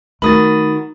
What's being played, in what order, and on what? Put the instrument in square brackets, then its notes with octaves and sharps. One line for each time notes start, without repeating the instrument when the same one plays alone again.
[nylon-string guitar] D#3 F#4 [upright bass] A3 F4 [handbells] B5 D#6 A6